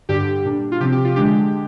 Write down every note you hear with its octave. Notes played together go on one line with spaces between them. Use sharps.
G2 D3 G3 G4
A#2 G3 D4
F4
C3 F3 C4 G4
G4
F4
D3 G#3 D4 G4